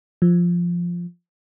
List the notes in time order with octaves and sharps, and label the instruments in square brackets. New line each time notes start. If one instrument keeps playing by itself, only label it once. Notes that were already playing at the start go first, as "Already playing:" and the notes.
[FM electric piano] F3